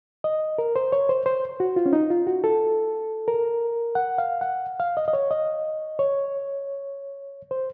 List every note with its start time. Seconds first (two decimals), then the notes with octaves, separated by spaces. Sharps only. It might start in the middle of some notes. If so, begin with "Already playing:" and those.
0.24 D#5
0.58 A#4
0.76 C5
0.92 C#5
1.09 C5
1.26 C5
1.60 F#4
1.76 F4
1.86 C#4
1.93 D#4
2.10 F4
2.27 F#4
2.44 A4
3.28 A#4
3.95 F#5
4.18 F5
4.41 F#5
4.80 F5
4.97 D#5
5.08 D#5
5.13 C#5
5.31 D#5
5.99 C#5
7.51 C5